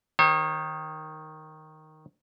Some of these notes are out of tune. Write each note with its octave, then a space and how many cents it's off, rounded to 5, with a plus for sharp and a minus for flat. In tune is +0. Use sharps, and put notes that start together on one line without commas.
D#3 +0 C#5 -45